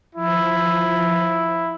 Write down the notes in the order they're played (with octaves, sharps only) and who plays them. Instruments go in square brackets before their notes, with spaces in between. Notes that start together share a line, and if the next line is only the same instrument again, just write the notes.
[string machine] F3 [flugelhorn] E4